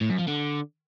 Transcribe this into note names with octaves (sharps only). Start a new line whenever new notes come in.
A2
F#2
F3
D3